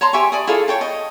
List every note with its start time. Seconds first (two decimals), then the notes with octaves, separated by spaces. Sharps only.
0.01 C#5 A5 A#5 C6
0.13 G4 E5 G#5 C#6
0.32 D5 G#5 D#6
0.47 E4 F4 G#4 A4
0.68 C#5 G5 A5
0.81 D#5